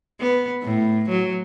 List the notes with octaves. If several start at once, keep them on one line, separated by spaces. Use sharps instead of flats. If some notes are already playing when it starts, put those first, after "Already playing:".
B3
A2
F#3